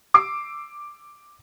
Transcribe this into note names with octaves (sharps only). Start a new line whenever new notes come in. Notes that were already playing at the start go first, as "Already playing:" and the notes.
D6 E6 C7